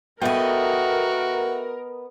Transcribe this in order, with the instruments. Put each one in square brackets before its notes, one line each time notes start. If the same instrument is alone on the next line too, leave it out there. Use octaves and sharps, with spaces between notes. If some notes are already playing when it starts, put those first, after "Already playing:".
[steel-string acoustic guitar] B3 D#5 [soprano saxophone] F#4 [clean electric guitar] A4 E5 G5 [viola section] A#4